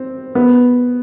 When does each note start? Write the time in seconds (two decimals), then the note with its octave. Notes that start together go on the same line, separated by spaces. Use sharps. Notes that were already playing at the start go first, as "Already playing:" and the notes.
Already playing: C4
0.35 B3